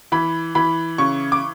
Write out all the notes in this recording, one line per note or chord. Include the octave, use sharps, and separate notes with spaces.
E3 B5
E3 B5
C#3 C#6
D6